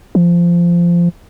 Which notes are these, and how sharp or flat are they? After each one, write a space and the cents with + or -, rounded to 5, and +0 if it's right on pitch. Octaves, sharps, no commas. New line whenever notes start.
F3 -15